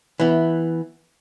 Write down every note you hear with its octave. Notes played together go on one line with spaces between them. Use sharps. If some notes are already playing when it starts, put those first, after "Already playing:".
E3 B3